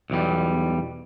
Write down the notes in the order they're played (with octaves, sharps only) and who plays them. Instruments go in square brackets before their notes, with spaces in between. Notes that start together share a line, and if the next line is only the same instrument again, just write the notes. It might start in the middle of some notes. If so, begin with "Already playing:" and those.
[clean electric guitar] B1 E2 G3